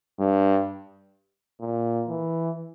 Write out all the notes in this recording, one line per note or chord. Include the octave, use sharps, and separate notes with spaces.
G2
A#2
E3